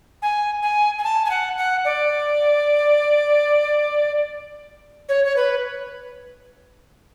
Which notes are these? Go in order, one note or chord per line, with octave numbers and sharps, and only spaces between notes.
G#5
G#5
G#5
A5
G#5
F#5
F#5
D5
C#5
C#5
B4